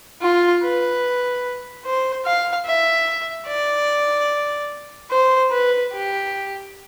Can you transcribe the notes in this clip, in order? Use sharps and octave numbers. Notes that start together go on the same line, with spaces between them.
F4
B4
C5
F5
E5
D5
C5
B4
G4